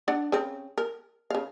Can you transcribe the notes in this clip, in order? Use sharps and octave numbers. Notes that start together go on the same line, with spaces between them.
D4 D5 F#5
C#3 C4
A#4
C#3 F5